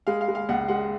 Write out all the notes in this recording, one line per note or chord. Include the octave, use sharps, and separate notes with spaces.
G#3 F5
F5
G#3
F5
C#2 F#5
G#3 F#5